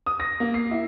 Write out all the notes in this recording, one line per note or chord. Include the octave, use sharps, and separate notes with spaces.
D#6
A#6
A#3
C7
E4